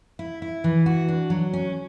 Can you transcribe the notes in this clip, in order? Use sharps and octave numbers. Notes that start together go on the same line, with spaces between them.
E4
E4
E3
F#4
D4
F#3
C#4